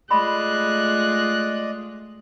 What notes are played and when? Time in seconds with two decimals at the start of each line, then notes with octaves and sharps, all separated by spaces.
0.11 G#3 A3 F4 D5 D#5 B5 C6 F#6